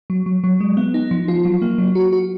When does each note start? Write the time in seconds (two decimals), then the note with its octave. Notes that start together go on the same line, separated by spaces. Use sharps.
0.10 F#3
0.26 F#3
0.44 F#3
0.60 G#3
0.77 B3
0.94 D#4
1.11 F3
1.28 F4
1.45 F#3
1.62 A#3
1.78 F#3
1.95 F#4
2.13 F#4